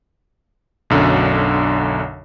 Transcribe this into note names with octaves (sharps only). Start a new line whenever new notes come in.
B1 F#2 D3